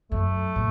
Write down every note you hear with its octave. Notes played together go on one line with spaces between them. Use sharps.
F#2 A3
A2